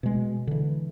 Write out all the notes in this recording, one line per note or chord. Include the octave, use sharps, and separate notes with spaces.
B2 G#3
D3 E3